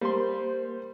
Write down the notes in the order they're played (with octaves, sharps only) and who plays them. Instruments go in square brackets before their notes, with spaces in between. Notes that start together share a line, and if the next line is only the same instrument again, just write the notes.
[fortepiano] G3 C6 [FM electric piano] A#3 [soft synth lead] C5